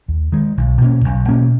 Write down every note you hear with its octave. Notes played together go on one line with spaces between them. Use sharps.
D#2
D#3 G#3
B1
B2 A#3 C#4
B1
B2 A#3 C#4